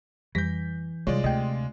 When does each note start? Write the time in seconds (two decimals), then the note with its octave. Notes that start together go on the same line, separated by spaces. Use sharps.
0.35 F2 E3 G3 G6 A#6 B6
1.07 C2 G3 G#3 F4 C#5 D5
1.24 D2 C3 D#5 G5